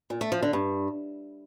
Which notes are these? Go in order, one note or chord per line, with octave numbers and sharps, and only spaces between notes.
A#2
A3
F3
D3
G2